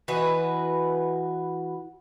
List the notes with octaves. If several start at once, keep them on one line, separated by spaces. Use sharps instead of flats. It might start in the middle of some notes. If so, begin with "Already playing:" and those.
E3 F#4 B4 D#5